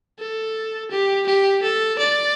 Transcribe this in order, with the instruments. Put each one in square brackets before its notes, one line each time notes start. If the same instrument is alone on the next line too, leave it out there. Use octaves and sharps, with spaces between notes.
[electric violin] A4
G4
G4
A4
D5